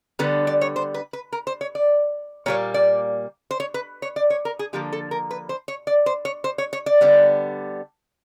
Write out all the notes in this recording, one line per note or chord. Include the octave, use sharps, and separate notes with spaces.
D3 G3 B3 B4
D5
C#5
C5
B4
B4
A#4
C5
C#5
D5
A#2 G3 A#3 C#5
D5
C5
C#5
B4
C#5
D5
C#5
A#4
G#4
D3 F3 A#3 G4
A4
A#4
B4
C5
C#5
D5
C5
C#5
C5
C#5
C#5
D5
D3 G3 B3